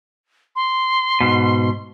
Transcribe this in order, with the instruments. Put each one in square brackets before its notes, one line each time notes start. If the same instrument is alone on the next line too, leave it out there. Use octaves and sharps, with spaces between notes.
[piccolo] C6
[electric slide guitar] G#2 B2